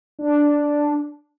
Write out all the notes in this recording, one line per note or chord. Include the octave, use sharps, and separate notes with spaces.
D4